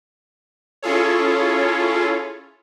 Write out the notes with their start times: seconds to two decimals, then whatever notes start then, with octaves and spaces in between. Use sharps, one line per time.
0.83 C#4 E4 F4 G#4 A4 C#5